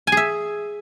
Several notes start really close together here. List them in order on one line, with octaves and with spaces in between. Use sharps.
G#5 G#4 E5